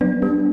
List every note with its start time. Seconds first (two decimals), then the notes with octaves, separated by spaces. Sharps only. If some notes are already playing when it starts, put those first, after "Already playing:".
0.01 F#3 B3 D4
0.22 G3 B3 D4